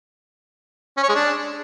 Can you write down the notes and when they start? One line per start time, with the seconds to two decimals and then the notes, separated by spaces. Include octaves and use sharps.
0.97 C#4
1.03 C#5
1.09 G#3
1.15 D4